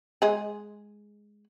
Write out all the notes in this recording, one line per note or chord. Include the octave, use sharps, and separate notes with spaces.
G#3 G#4